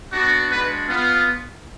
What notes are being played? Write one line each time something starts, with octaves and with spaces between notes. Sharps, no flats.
B3 D4 F#4
G#3 D4 F#4 B4
B3 F4